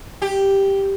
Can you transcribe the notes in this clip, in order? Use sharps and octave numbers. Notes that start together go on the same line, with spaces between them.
G4